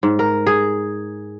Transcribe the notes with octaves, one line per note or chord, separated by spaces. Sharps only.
G#2
A#4
G#4